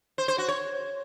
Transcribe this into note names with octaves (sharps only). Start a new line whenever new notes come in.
C5
C5
F#4
C#5